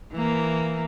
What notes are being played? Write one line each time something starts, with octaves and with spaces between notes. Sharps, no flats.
E3 A#3